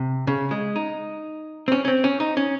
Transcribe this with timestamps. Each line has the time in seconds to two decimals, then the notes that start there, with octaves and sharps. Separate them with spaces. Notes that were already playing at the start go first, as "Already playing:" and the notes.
Already playing: C3
0.27 C#3
0.51 G#3
0.76 D#4
1.68 C4
1.72 C#4
1.85 C#4
1.88 C4
2.04 C#4
2.20 D#4
2.37 C#4